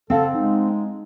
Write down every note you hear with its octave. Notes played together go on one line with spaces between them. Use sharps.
C#3 C4 A4 F5 F#5
G#3 D#4